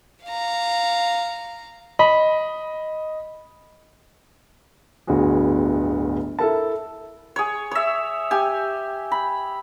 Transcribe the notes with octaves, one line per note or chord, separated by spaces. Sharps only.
F5 A#5
D#5 B5
D1 G1 B3 F#4 G#4
E4 A4 A#4 A5
G#4 C#5
C#5 E5
G4 G#5
B5